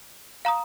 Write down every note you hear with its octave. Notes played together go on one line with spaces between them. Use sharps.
F5 A#5 D#6